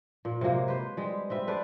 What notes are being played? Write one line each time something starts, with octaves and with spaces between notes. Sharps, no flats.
A#2
C3 F#3 G#3 A#3
B4 C5
G3 G#3
C4 B4 E5
D4 B4 C5 D5